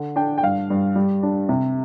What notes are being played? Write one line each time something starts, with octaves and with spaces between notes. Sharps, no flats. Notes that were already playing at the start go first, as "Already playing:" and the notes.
Already playing: D3
D4 G5
G5
G2 F5
G2
G3
D4
C3